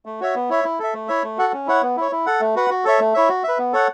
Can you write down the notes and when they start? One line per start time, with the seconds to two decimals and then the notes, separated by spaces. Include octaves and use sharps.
0.06 A3
0.20 F#4 C#5 E5
0.35 B3
0.49 E4 C#5 E5
0.64 E4
0.79 A4 E5
0.94 A3
1.08 E4 C#5 E5
1.23 A3
1.38 F#4 A4 F#5
1.53 C#4
1.67 E4 C#5 F#5
1.82 B3
1.97 E4 C#5
2.11 E4
2.26 A4 F#5
2.40 A3
2.55 F#4 B4 F#5
2.70 F#4
2.84 A4 C#5 E5
2.99 A3
3.14 E4 C#5 E5
3.29 F#4
3.44 B4 E5
3.58 B3
3.73 A4 C#5 F#5